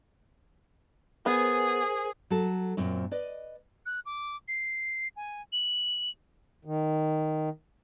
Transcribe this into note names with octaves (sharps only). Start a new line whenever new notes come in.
B3 G#4 A#4 C5 G#5
F#3 A4
F#2 A#2 C4
B4 D5 D#5
F#6
D6
C7
G#5
F#7
D#3